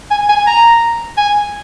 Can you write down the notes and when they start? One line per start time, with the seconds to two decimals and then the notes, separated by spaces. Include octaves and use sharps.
0.11 G#5
0.29 G#5
0.47 A#5
1.17 G#5